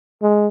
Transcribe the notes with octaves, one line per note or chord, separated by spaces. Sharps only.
G#3